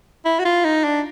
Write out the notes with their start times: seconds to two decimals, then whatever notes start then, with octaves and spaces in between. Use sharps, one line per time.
0.25 E4
0.39 F#4
0.45 F4
0.64 D#4
0.84 D4